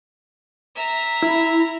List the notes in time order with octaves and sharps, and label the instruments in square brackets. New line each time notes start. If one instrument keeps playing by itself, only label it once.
[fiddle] E5 A#5
[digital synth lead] E4